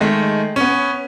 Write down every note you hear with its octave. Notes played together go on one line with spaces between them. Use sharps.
D#3 G#3 A3
B3 C#4